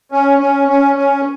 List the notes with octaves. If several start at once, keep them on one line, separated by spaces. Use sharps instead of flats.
C#4
C#4
C#4
C#4